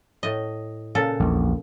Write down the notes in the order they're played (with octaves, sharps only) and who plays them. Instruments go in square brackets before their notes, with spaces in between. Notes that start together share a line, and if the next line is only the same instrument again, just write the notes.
[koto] A2 D#5
A#2 C#3 A4
[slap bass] A#1 E2